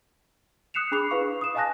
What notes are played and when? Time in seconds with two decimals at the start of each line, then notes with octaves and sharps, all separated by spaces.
0.74 D#6 F#6 C7 C#7 E7 F7
0.92 D4 G#4 B5 D6 C7 F7
1.11 E4 B4 F5 C#6
1.41 D#6 E7
1.55 D#5 F5 G#5 A5 F#6 A#6